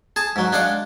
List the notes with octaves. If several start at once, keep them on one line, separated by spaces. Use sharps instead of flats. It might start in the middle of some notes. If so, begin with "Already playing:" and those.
G#4 A5
G#2 F#3
G#3 D4 F5 F#5 D6